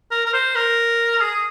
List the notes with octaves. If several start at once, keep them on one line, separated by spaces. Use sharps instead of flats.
A#4
A#4
C5
A#4
G#4